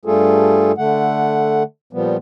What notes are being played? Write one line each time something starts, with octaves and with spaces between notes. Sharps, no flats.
G2 G3 A3 F4 G#4 A4
D3 A3 F#5
A#2 F3 G3 B3